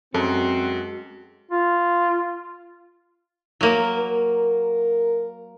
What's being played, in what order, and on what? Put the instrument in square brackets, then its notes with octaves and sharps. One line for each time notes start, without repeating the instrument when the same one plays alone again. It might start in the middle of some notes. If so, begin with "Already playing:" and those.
[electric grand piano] F#2 [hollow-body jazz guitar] G#3 A4 [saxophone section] C4 [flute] F#4
[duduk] F4
[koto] F#3 A#3
[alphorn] A#4